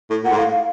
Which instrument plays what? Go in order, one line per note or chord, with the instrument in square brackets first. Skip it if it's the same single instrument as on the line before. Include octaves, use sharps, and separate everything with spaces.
[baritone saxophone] A2
[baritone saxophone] A#2 [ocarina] F#5
[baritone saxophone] G#2
[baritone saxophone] A2 [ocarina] F5
[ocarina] F5